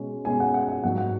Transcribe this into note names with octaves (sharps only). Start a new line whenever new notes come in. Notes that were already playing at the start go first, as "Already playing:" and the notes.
Already playing: B2 G#3 C#4
B2 G#3 C#4 G#5
F#5
F#5
F#5
G#2 F#3 A#3 F#5
F#5